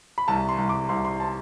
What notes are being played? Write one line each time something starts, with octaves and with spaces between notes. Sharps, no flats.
B5
C2 A5
C6
C2
D6
C2 C6
C6
A5